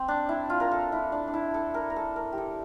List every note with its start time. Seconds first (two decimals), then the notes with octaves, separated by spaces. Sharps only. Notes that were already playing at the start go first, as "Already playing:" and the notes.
Already playing: C4
0.08 D4
0.29 E4
0.50 F4
0.60 A#4
0.71 A4
0.92 E4
1.12 D4
1.28 D4
1.34 E4
1.54 A4
1.74 A#4
1.90 A#4
1.96 A4
2.16 A#4
2.32 G4
2.38 A4